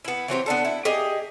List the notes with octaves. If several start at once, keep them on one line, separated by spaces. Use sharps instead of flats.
B3 E4
E3 F#3 C4 G4
B3 D4 A4
E4
G4 G#4 D#5